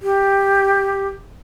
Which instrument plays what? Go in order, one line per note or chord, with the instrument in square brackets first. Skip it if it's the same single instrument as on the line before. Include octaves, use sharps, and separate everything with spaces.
[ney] G4